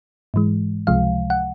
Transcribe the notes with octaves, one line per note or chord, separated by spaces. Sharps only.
G#2 E3 G#3
C#2 C3 F3 G#3 F5
F#5